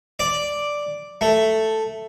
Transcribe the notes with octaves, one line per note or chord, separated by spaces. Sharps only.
D5
A3